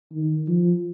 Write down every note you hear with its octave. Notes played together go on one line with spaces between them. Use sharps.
D#3
F3